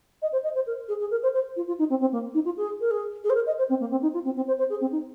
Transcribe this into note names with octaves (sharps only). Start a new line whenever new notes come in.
D#5
C5
D#5
C5
A#4
G#4
G#4
A#4
C5
C5
F4
F4
D#4
C4
C4
A#3
D#4
F4
G#4
A#4
G#4
G#4
C5
A#4
D#5
C5
C4
A#3
C4
D#4
F4
C4
C4
C5
C5
G#4
C4
D#4